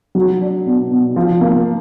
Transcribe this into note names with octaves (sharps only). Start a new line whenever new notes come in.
F#3
D4
B2
B2
F3
A#3